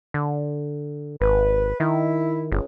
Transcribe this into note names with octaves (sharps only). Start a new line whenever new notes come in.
D3
G#1 B4
D#3 E4
G1 C#2